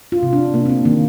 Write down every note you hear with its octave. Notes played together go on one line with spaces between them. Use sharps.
F4
C3
D4
C3 A#3
C4
D4
D#3 A#3